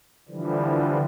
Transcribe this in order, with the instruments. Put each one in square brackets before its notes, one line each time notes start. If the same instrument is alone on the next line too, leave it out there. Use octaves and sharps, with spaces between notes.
[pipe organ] D3 E3 F3 G3